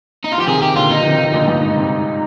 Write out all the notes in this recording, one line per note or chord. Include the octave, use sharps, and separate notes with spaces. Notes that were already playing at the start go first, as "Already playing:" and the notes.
D#4
F4
F3 G4
C3 D#3 G#4
C3 D#3 G4
A#2 D3 F4
D#3 D#4
F3
C3 D#3
D#3
A#2 D3
G2 A#2
G#2
G#2 C3